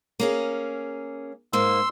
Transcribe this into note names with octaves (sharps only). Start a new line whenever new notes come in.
A#3 C#4 G#4
G#2 A#3 C6 E6